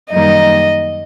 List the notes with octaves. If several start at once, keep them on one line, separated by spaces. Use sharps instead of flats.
F#2 D#3 G3 A#3 D#4 D#5